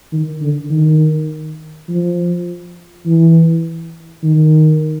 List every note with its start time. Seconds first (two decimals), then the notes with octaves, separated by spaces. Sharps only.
0.12 D#3
0.41 D3
0.70 D#3
1.88 F3
3.06 E3
4.23 D#3